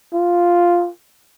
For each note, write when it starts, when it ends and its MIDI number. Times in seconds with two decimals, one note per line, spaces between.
0.14 0.89 65